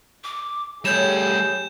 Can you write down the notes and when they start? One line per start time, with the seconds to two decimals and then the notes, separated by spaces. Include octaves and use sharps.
0.24 D6
0.85 G3 A3 G4 G#4 C#5 G6 E7